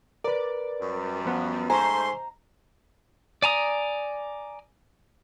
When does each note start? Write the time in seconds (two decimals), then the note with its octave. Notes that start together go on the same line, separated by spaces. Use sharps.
0.24 A#4 B4 D5
0.81 F#2 G3
1.25 F3 B3
1.70 G#2 A3 C5 G#5 A#5 C6 C#6
3.42 D5 G#5 A#5 D#6